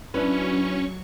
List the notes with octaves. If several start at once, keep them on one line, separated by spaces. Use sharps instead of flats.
F#3 C#4 D4 E4 B4 C#6